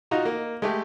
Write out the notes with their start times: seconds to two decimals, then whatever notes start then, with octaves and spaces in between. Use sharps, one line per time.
0.11 D#4 F4 F#4 D#5 A#5
0.25 A#3
0.62 G#3 A3 G4